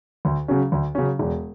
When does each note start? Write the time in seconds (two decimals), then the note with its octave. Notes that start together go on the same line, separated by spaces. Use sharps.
0.25 D2
0.48 C#3 F#3 C#4
0.72 D2
0.95 C#3 F#3 C#4
1.19 E1